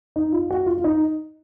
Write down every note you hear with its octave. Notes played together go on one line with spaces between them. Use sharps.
D#4
F4
F#4
F4
F4
D#4